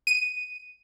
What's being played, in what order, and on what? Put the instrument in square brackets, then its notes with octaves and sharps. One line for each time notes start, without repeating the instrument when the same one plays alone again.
[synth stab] D#7